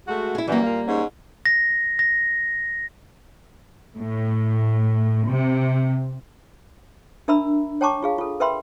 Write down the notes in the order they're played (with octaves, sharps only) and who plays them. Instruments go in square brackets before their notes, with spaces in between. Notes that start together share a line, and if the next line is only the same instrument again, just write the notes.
[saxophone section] G#3 A3 F#4
[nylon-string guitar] E4 G#4
[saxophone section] F#2 E3 [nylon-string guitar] G3 A#3
[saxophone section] A#2 F5
G#2 C#4
[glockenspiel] A#6
A#6
[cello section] A2
C3
[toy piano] D4 A#4 E5 A#5 B5 E6
C#5 G5 A5 A#5 C#6 D6
F4 G#4 F5
F4 A4
A#4 B4 E5 G5 B5 C6